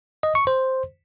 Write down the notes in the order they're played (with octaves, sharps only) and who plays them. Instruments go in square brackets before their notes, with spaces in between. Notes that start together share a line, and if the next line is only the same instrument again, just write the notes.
[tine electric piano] D#5
C#6
C5